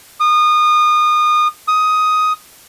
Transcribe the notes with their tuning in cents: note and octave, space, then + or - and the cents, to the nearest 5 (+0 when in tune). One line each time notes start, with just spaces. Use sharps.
D#6 -30
D#6 +10